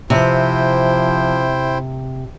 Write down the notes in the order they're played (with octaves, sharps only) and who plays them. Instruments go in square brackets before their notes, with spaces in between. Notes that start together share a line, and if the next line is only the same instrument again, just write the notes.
[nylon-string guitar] C3 [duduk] F3 [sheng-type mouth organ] E4 C5 G5